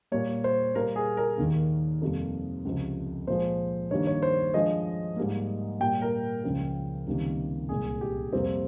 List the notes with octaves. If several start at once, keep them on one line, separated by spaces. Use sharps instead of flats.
A#2 G3 A#3 C#5
C5
A#2 G3 A#3 A#4
G#4
A#4
D#2 D#3 A#3
F2 C3 G3 A#3
C#2 C3 F3
A#2 F3 G#3 C5
G2 D#3 G3 A#3 C#5
C#5
C5
G2 F3 G#3 D#5
G#2 G3 A#3
A#2 G3 A#3 G5
A#4
C#2 C#3 F3
C#2 C3 D#3 G3 A#3
C2 A#2 G#3 G#4
G4
F2 C3 G3 A#3 C4